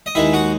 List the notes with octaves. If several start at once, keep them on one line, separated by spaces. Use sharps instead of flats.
D#5
D#2 D#3 G#3 E4 E5
F#4 F#5